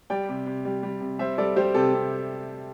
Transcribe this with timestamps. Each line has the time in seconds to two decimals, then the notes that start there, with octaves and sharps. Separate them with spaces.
0.10 G3 D5 G5
0.29 C3
0.46 C3
0.65 G3
0.83 G3
1.01 C3
1.19 G3 C5 E5
1.38 G3 A4 D5
1.56 G3 G4 C5
1.75 C3 A4
1.93 C3